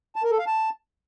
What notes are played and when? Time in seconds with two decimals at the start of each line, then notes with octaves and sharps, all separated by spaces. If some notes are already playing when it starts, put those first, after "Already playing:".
0.16 A5
0.23 A#4
0.31 A4
0.39 F5
0.47 A5